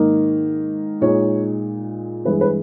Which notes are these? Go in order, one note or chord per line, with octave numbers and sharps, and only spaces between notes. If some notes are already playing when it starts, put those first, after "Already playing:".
Already playing: G#2 D#3 A#3 D#4
A#2 G#3 D#4 C#5
G2 E3 G#3 B4
B4